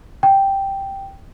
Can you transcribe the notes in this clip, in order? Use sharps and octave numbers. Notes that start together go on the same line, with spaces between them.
G5